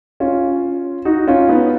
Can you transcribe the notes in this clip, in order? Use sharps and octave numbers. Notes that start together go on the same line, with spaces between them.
C#4 F4
D#4 F#4
C#4 F4
B3 D#4